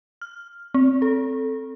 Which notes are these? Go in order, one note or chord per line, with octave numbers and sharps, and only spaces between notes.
F6
C4
A4